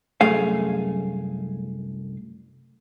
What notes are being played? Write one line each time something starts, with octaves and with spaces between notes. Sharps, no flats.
C2 F#2 A3 G#4 F5